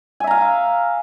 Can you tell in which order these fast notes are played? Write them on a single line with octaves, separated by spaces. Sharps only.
G#5 E5 A#5 F5